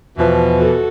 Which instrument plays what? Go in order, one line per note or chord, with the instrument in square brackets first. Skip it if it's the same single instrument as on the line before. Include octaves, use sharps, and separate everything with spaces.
[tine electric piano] E2 F3 [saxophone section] B2 E3
[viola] F#4 A4